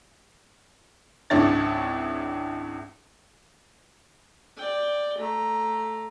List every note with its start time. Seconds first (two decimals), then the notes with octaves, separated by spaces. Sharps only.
1.30 G#1 C#2 D4 E4 C#5 A6
4.57 D5 G5
5.18 A3 A#5